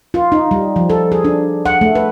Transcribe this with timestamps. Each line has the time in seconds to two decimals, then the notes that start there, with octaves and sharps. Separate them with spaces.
0.14 F4
0.32 D#4
0.51 G3
0.76 F3
0.90 A4
1.12 G#4
1.25 D4
1.65 F#5
1.81 A3
1.95 B4